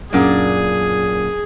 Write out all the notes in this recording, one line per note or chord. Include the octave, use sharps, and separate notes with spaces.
F#2 A#2 D4 G#4 F#5